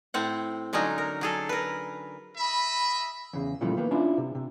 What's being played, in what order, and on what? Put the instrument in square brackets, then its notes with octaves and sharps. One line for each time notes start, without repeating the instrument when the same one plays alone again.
[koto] A2 C4 F#5
D3 F#3 G#3 C#4 D#4
A#4
F#3 G#4 A4
A#4 B4
[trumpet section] D#5 E5 [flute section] B5
[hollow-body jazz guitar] E2 C#3
A#2 C#3 E3 F3 G3 A3
D#3 A#3 B3
C#4 D4 E4 F4
C3
C3